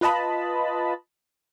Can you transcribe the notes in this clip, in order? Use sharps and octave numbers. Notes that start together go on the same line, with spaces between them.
F4 B4 D#5 A5 B5